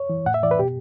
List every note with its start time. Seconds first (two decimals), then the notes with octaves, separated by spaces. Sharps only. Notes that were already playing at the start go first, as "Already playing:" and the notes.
Already playing: C#5
0.10 E3
0.26 A2 F#5
0.34 E5
0.43 E3 D5
0.51 B4
0.59 B2 G4